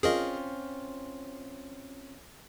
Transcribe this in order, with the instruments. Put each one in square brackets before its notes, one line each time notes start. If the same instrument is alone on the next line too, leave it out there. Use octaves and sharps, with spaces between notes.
[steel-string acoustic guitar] C4 C#4 F4 [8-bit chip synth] G#4 A#4 D#5